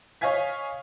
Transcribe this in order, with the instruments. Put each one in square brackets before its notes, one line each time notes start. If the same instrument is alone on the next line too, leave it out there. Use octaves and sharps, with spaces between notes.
[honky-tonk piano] C#5 D#5 F5 G#5 G#6 B6